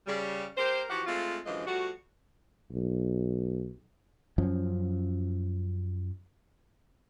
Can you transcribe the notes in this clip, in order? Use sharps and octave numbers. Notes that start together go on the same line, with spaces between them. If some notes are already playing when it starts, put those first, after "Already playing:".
C#3 G3
A#3 G4 A#4 C5
E3 F3 F#4 G4 F#5
G#3 A3 C4 F4
F#2 D3 E3 F3 G#3 D#5
F3 G3 A3 F#4
B1
F#2 F3 C#4